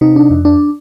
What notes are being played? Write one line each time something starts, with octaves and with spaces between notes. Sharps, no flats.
C3 D#4
D4
F2
D4